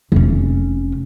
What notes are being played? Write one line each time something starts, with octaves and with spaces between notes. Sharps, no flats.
F1 C#4